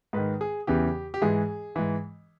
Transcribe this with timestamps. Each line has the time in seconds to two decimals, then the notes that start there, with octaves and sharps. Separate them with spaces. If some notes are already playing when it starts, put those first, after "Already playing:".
0.13 G#2 D#3 B4
0.41 G#4
0.67 E2 C#3 E3 G4
1.14 G4
1.21 G#2 E3 G#4
1.76 G#2 E3